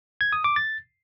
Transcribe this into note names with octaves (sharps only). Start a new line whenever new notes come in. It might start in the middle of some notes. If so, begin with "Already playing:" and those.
G#6
D#6
D6
A6